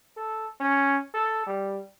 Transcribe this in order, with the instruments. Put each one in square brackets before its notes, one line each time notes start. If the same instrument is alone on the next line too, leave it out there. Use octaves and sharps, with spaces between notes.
[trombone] A4
C#4
A4
G3